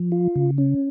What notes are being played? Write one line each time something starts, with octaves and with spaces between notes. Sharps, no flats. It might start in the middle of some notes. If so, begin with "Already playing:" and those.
Already playing: F3
F4
C#3
C#4